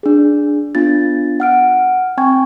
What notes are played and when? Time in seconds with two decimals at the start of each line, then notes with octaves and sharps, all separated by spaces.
0.03 D4 G#4
0.75 B3 D4 F4 A6
1.40 F#5 F6 D7
2.17 C4 G5 G#5 C#6 G#6